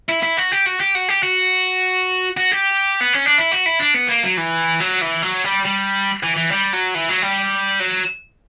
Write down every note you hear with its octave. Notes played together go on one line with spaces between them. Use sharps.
E4
E4
F#4
G4
F#4
G4
F#4
G4
F#4
F#4
G4
B3
C#4
D4
E4
F#4
E4
D4
B3
A#3
F#3
E3
F#3
E3
F#3
G3
G3
E3
E3
G3
F#3
E3
F#3
G3
F#3